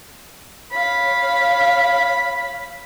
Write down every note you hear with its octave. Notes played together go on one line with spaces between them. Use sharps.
C#5 F5 B5